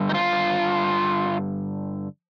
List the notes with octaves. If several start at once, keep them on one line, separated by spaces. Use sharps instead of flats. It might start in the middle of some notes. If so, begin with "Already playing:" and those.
Already playing: G2 D3
D#4
F4